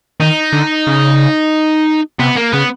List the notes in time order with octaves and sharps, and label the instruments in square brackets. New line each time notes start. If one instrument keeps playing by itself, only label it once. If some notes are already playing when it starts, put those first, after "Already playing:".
[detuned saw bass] D#3 [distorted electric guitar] D#4
[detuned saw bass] D3
C#3
[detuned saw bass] C3 [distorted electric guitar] B3
[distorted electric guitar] A#3
[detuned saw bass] C#3 [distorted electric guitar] B3